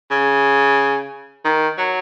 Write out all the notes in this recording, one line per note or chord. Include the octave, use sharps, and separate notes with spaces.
C#3
D#3
F#3